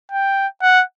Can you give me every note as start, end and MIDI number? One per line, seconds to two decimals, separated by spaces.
0.11 0.47 79
0.62 0.83 78